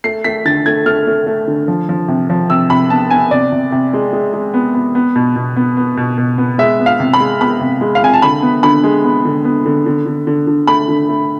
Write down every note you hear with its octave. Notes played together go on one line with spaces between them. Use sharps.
A3 C7
A3 B6
D3 A6
A3 G#6
A3 F6
A3
A3
D3
F3
F3
C3
F3
C3 E6
C3 B5
B3 A5
B3 G#5
C3 D5
C3
C3
G#3
G#3
G#3
B3
B3
B3
B2
B2
B3
B3
B2
B2
B3
G#3 E5
B3
F5
C3
B5
G#3
B3 B5
C3
G#3
F5
C3 G#5
A5
D3 B5
B3
D3 B5
G#3
B3
D3
B3
D3
D3
D3
D3
D3
A3 B5
D3
A3